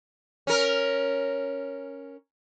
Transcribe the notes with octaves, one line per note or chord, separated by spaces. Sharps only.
C#4 A#4